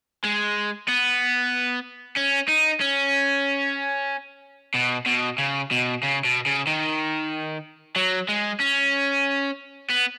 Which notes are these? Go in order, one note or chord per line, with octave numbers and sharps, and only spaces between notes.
G#3
B3
C#4
D#4
C#4
B2
B2
C#3
B2
C#3
B2
C#3
D#3
F#3
G#3
C#4
B3